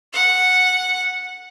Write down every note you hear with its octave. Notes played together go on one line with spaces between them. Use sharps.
F#5